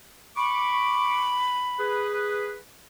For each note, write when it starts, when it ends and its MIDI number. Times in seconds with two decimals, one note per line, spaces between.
0.37 2.09 83
0.37 1.44 85
0.37 1.44 86
1.79 2.57 68
1.79 2.57 71